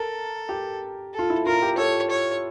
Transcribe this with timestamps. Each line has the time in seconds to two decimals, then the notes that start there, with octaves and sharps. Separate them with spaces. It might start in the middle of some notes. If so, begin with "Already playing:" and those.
Already playing: A4 A#4
0.49 G4
1.14 F4 A4
1.30 E4
1.46 F4 A#4
1.62 G4
1.78 A4 C#5
2.11 C#5